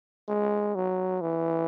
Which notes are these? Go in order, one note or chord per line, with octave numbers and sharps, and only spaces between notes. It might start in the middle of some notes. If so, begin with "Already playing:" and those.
G#3
F#3
E3